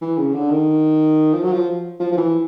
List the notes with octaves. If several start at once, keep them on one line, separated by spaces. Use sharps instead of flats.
E3
C#3
D3
D#3
F3
F#3
F3
F3
F3
E3